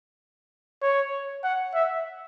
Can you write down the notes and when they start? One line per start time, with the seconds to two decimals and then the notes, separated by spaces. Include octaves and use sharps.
0.82 C#5
1.44 F#5
1.74 E5